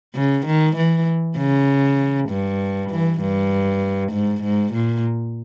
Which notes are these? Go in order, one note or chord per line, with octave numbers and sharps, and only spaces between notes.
C#3
D#3
E3
C#3
G2
E3
G2
G#2
G#2
A#2